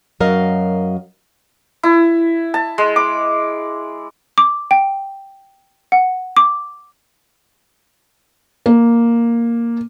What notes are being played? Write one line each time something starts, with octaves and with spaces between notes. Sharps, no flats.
F#2 F#3 A#4 D#5 F5
E4
A5
G#3
D6
D6
G5
F#5
D6
A#3